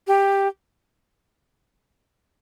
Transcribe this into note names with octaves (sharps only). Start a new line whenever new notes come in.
G4